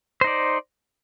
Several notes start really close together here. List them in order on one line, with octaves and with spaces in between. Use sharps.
C5 D#4 D5